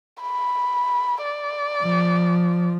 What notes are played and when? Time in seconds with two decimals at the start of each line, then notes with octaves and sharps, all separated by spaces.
0.22 B5
1.24 D5
1.83 F3